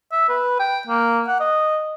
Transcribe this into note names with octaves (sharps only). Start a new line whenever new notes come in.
E5
B4
G5
A#3
F#5
D#5